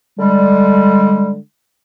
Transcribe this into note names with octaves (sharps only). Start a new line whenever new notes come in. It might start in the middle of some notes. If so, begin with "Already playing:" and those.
D3 G3 G#3